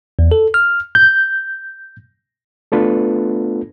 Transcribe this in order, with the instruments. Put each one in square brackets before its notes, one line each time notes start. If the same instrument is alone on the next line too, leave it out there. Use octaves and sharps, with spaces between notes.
[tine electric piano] E2
A4
F6
[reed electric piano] G6
A3 B3 D4 F4 A4 B4